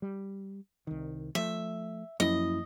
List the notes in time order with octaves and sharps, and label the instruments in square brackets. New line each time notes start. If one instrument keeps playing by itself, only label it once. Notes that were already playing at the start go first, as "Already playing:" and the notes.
[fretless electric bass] G3
C2 D#3
[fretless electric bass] F3 A3 [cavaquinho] E5
[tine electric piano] F#2 E4 D#6 [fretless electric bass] F3 A#3 [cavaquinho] D#5